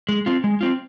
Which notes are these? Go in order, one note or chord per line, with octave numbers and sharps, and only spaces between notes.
G#3
C4 F4
G#3
C4 F4